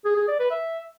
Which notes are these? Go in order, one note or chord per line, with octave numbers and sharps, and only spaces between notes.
G#4
G#4
D5
B4
E5